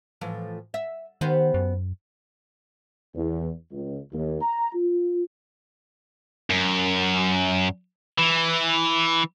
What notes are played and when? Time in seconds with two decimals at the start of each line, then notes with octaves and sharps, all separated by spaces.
0.21 A2 E3 F3
0.74 E5
1.21 D#3 B3 G4 C5
1.54 F#2
3.15 E2
3.71 C#2
4.12 D#2
4.41 A#5
4.74 F4
6.50 F#2
8.18 E3